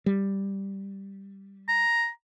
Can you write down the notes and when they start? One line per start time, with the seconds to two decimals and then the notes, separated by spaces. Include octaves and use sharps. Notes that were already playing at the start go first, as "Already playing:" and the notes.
0.06 G3
1.69 A#5